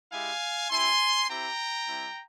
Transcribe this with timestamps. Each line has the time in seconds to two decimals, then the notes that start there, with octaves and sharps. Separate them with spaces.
0.11 G#3 E4 G4 F5 G#5
0.70 C4 E4 G4 G#5 C6
1.29 C4 E4 G4 G5 A#5
1.88 G3 C4 E4